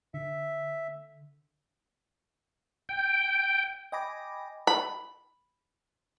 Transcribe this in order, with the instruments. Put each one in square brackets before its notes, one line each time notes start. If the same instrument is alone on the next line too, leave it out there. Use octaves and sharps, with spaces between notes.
[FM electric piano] D3 [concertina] E5
[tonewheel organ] G5
[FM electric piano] D#5 G5 G#5 B5 D6 A#6
[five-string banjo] B5